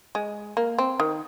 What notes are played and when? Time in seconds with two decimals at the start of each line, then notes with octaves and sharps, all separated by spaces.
0.15 G#3
0.57 A#3
0.79 C4
1.00 D#3